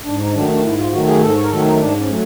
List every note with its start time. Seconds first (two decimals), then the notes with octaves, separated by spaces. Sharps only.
0.05 G#2 D4
0.20 D#4
0.34 D#3 F#3 A3 D4
0.49 D4
0.64 G#2 E4
0.78 F4
0.93 D#3 F#3 A3 F#4
1.08 G#4
1.21 G#2 A4
1.37 C#5
1.44 A#4
1.51 D#3 F#3 A3 A4
1.65 D#4
1.80 G#2 D4
1.99 C#4
2.09 F#3 A3